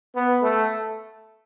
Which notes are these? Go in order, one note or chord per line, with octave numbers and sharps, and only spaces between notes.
B3
A3